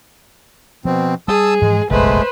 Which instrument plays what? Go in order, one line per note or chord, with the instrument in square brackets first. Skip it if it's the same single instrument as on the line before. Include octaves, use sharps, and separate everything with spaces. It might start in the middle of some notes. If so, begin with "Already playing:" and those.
[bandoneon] B2 C4 [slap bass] F3
[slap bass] G3 [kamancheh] G#4 [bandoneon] A5 D#6 E6
[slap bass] G#2 E3 F3 [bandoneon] G#3
[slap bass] F#1 B1 F2 [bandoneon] G#3 A3 [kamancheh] B4 C5